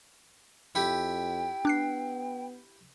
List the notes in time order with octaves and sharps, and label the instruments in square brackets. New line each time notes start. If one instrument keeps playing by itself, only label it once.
[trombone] F2 [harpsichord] E4 G4 [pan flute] G5
[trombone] B3 [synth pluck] D4 F#6 C7